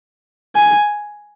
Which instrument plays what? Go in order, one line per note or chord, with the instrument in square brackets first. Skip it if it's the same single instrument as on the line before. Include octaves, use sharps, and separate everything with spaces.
[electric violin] G#5